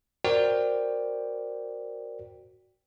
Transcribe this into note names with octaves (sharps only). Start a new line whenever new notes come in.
F#4 A#4 C5 D5 G5